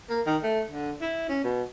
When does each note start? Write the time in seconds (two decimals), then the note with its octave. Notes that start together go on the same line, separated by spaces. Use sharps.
0.09 A#3
0.26 D#3
0.43 A3
0.70 D3
1.01 E4
1.29 C#4
1.44 B2